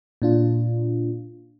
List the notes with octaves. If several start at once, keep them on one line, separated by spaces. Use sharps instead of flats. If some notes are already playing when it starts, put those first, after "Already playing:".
A#2 D4 F4